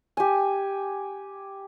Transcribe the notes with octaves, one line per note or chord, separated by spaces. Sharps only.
G4 G#5